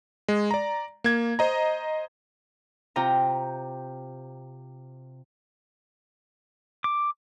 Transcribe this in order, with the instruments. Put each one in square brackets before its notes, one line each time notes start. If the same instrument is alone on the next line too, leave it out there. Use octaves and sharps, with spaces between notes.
[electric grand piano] G#3
D5 A#5
A#3 G#6
C5 D#5 A#5
[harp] C3 F4 G5 A#5
[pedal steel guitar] D6